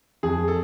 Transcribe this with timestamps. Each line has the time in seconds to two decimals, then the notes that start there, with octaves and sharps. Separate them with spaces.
0.23 F2 G#4
0.48 A4